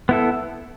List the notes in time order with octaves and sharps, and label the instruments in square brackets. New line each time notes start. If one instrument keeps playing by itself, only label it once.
[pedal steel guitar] B3 E4 A4